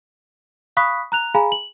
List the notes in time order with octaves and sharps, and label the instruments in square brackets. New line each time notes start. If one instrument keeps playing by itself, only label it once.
[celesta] F5 B5 C#6 D#6 F#6 B6
A#5 F#6 F7
G#4 F5 G#5 A#5 B5
F#7